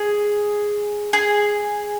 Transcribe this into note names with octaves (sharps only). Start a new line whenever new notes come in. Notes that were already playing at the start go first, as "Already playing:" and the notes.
Already playing: G#4
G#4